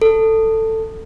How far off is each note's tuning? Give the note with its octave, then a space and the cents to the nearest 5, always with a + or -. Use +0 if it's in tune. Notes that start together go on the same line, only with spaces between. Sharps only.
A4 +15